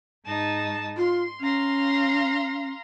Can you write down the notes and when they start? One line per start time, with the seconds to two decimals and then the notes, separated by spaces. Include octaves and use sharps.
0.24 G#2 D#4 A5
0.97 F4 C6
1.41 C#4 F5 A#5 C6